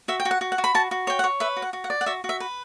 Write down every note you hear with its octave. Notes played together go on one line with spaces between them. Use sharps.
F#4 E5
G5
F#4
F#5
F#4
F#5
F#4
B5
F#4 A5
F#4
C#5 G5
F#5
C#5
B4 E5
F#4
F#5
F#4
F#5
D5
F#5
F#4 E5
F#4
E5
B4